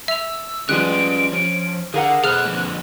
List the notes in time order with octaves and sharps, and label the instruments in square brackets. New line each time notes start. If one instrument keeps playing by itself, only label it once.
[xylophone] E5 F7 [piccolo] E6
[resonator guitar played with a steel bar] F3 G3 G#3 [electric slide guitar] C#4 B4 [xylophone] F#6 [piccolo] D7
[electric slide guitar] F3 [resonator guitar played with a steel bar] C#4
[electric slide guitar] D3 [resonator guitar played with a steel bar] G#4 A#4 F#5 [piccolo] F5
[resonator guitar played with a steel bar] B2 [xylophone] G#4 F6 [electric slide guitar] A4 C5 [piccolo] F#6
[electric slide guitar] D3 F3 A#3